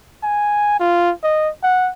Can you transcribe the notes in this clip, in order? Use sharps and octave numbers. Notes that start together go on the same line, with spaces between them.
G#5
F4
D#5
F#5